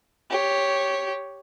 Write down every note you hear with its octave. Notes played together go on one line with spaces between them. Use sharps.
G4 C#5